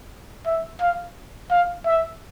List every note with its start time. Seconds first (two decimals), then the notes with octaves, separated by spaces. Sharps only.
0.46 E5
0.81 F5
1.51 F5
1.86 E5